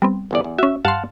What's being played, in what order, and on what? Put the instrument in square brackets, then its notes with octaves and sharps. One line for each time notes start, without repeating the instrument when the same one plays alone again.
[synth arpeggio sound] G3 B3 C4
[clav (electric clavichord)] G1 E2 D5
E2
[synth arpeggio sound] C#4 F#4 [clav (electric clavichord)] E5
[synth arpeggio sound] G2 C6 [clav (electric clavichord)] F5 F#5 A5